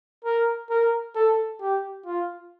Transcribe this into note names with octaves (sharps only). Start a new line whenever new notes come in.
A#4
A#4
A4
G4
F4